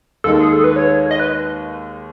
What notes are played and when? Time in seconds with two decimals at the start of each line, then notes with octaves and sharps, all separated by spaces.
0.24 D#2 D#3 G#3 D#4 A4
0.40 G#4
0.53 A4
0.64 B4
0.76 C#5
1.11 D#5
1.20 B4